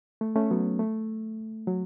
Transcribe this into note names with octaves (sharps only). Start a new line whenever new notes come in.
A3
A3 C#4
F#3 B3
A3
F#3